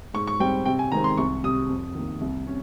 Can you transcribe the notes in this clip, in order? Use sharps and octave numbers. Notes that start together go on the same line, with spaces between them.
G#2 C#6
C#6
G3 C4 G5
C3 G5
G#5
D#3 G#3 C4 A#5
C6
C2 C#6
C3 G3 D#6
F2
D#3 A#3
C2
C3 C#4